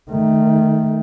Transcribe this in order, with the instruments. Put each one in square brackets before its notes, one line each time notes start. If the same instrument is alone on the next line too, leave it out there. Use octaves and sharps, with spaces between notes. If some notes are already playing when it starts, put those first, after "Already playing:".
[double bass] D#3 A3